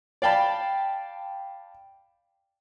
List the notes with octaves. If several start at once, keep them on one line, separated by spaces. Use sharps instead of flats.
D5 F5 G5 A5 B5